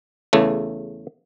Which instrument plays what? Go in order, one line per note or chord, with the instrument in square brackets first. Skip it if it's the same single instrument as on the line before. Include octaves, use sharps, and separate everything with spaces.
[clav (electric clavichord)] E2 C#3 A3